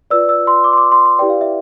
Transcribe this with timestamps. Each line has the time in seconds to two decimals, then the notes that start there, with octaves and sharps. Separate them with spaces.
0.11 F4 B4 D5 E6
0.29 E6
0.47 C6
0.64 D6
0.73 C6
0.78 D6
0.92 C6
1.06 C6
1.19 E4 G4 B4 D5 G5
1.30 F5
1.41 E5